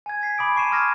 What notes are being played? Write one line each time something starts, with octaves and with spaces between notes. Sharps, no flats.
G#5 G#6
G#6 B6 C7
A#5 B5 D6 D#6 D7
A5 C#6 C7 D#7 E7
C6 D6 D#6 F6 G#6 A#6